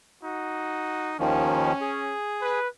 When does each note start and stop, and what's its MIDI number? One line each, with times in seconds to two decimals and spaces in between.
0.23 1.15 63
0.23 1.15 66
1.20 1.73 39
1.20 1.73 51
1.20 1.73 53
1.20 2.13 61
1.81 2.60 68
2.41 2.67 71